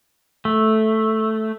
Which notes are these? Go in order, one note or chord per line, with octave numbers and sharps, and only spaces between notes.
A3